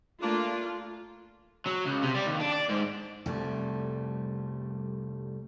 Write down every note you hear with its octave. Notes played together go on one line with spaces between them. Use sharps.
A3 A#3 D4 F4
F#3
C#2
C3
G3
D#2
D4
D5
G#2
C2 F2 G3 A3